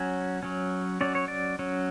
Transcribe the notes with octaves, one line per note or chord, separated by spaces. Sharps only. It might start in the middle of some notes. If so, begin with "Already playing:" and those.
Already playing: F#3 C#4
F#3 C#4
F#3 C#4 D5
C#5
D5
F#3 C#4